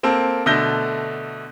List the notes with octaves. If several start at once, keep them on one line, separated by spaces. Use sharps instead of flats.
A#3 C4 A4
B2 D3 A3 G6 A#6 G7